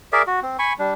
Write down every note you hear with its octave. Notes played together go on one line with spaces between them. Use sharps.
G#4 A#4 D5 E5
F#4
C4
G#5 B5 C#6
G3 D4